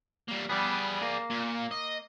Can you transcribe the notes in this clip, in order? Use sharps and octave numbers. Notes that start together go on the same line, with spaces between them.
G3 A#3
G3 B3 G#4 D5
A#3
A#2
D#5